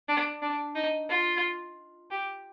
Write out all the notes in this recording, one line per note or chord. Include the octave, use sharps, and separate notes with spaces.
D4
D4
D#4
F4
G4